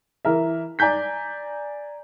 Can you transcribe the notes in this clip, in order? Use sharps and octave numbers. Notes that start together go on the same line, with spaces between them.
E3 A#4 E5
D5 G#5 A#5 G6 B6